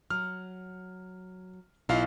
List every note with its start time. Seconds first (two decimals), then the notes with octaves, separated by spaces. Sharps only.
0.10 F#3 F6
1.89 B1 E4 F4 D#5 F5